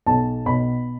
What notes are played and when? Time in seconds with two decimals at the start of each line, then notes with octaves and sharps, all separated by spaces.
0.06 B1 A5
0.46 B2 B5